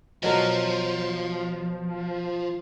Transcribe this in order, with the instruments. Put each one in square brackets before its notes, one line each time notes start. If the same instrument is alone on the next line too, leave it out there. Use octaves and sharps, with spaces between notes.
[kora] B2 F#3 A#4 [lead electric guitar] F3